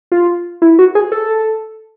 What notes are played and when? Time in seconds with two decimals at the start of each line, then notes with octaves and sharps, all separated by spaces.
0.12 F4
0.62 E4
0.79 F#4
0.95 G#4
1.12 A4